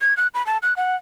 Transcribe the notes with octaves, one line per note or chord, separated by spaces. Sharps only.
G#6
F#6
B5
A5
F#6
F#5